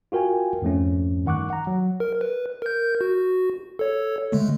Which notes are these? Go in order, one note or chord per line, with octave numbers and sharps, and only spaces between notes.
F4 F#4 A#4 G5 G#5
F2 G#2 F3 A3 C#4
G2 D#3 F#5 C#6 D6 F#6
F#5 A#5
F#3
A#4
B4
A#4 G6
F#4
A4 C#5
D3 G#3 A3